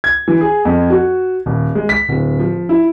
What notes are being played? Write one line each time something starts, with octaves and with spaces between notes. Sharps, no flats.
G#6
E3
G#4
F2
F#4
D#1
G#3
B6
D1
F3
E4